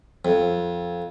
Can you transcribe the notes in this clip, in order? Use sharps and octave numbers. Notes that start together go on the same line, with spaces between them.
F2